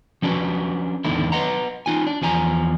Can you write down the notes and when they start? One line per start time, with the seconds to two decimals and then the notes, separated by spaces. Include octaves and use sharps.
0.22 F3 C#4 D4 F#4 B4
1.04 E2 A2 D3 D#3 D4 E4
1.32 B4 C5 D#5 F#5 A#5
1.86 D#4 F4 G#5
2.07 D4
2.22 E2 F3 G#5 A#5